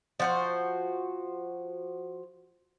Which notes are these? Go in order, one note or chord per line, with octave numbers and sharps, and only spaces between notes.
F3 F#4 C5